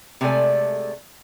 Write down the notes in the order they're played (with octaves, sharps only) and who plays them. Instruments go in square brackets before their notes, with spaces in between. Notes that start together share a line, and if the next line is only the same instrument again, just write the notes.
[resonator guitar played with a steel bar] C3 G#3 A3 A4 D5 G#5